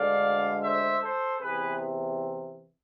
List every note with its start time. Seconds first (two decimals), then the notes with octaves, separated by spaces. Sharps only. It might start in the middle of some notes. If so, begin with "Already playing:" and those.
Already playing: D2 D3 G#3 D5 F5
0.63 C5 E5
1.01 A4 C5
1.40 E2 C3 E3 G#4 B4